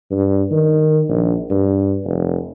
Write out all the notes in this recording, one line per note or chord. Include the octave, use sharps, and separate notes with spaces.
G2
D#3
A#1
G2
F1